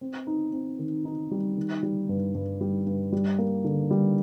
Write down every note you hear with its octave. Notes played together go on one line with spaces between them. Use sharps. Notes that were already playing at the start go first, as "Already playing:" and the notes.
C4
D#4
C4
D#3
D#4
G3
D#3
G3
G2
G2
G3
G2
G3
A#3
D3
G3